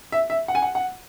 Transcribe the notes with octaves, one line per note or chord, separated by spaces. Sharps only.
E5
E5
F#5
G#5
F#5
F#5